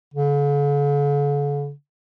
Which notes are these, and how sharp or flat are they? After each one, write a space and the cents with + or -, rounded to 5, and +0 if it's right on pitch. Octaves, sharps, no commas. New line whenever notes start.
D3 -45